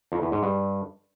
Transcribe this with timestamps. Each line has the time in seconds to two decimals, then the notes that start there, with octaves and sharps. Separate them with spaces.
0.12 F2
0.22 E2
0.32 G#2
0.43 G2